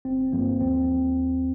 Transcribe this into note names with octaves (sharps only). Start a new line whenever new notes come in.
G1 C4
G2 F3 A#3
D#2 C4